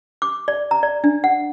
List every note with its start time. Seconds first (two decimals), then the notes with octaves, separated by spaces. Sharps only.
0.22 D6
0.48 D5
0.71 A#5
0.83 D5
1.04 D4
1.24 F#5